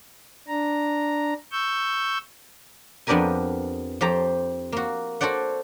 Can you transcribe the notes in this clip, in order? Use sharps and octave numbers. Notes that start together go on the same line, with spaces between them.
D4 A#5
C#6 E6 G6
F2 B3 D4 G4 A#4 G#5
F2 G4 C5 A5 A#5
A#3 F#4
F#4 A4 C5 D5 F#5